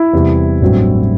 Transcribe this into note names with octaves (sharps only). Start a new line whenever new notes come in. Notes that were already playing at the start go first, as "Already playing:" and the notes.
Already playing: E4
E2 C3 G3
A1 G2 F#3 A3 C4